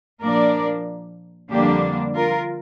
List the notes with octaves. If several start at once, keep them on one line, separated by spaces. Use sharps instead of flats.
A#2 F3 A#3 D4 A#4 D5
F2 D3 G3 A#3 D4 G4
F4 A#4